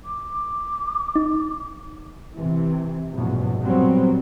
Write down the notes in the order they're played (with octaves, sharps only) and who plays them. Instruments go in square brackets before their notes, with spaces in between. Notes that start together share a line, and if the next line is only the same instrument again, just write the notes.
[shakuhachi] D6
[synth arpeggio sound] D#4
[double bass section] C3 E3
A#1 E2 G#2 B2 F#3
A#2 F#3 G3 B3 C4